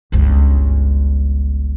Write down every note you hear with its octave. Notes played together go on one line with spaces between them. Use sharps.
G1 C#2